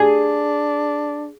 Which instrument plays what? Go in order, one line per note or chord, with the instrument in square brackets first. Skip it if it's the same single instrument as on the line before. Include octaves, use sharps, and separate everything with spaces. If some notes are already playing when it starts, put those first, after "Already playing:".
Already playing: [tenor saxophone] D4 [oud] G#4